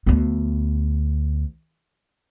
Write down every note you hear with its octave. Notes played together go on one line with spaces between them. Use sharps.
D2 B3